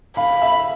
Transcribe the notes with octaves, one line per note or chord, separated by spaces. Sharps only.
F5 B5
E5